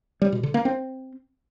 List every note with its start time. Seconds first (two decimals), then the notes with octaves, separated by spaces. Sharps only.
0.22 G3
0.32 B2
0.43 D3
0.54 A#3
0.65 C4